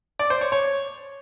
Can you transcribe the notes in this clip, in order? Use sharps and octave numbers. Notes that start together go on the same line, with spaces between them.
D5
C5
C#5
C#5